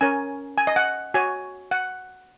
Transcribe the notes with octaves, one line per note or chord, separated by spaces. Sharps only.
C#4 A#4 C#5 G#5
G#5
D#5
F#5
F#4 C#5 G#5
F#5